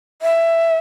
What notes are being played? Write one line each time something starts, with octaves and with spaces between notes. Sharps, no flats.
E5